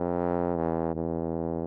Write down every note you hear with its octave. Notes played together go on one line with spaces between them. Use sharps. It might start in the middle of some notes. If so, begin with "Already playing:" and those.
Already playing: F2
E2
E2